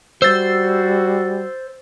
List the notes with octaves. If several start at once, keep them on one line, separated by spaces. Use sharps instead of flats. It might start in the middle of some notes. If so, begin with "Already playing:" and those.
G3 F#4 C5 E6 A6